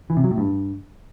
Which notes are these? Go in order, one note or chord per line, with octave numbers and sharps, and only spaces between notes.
E3
C3
F#3
A2
G2